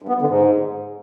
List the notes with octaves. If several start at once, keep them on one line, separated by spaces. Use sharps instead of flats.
G2
B3
G2
D3
G#2